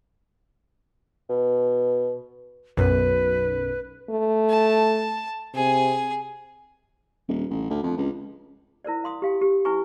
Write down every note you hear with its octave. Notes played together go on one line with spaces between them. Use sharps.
B2
B1 F#2 B4
A3
A5
C3 G#4 G#5
D#1
A1
D2
F2
C#2
E4 A#4 C5 D5
F5 C6 D#6
G4 F5 G5
G4
C#4 E4 G4 B4 G#5 C#6